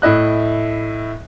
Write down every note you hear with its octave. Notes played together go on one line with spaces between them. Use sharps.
A2 E4 D#5 F#6